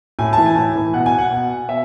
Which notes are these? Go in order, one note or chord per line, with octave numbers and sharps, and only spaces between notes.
A2 G#5
A5
E3
G#5
A2
E3
B2 F#5
G#5
F#5
B2
B2 E5